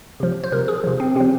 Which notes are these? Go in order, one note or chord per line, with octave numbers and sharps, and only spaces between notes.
C3 F3
C5
C3 F3 A#4
G#4
C3 F3
C4
C3 F3 C4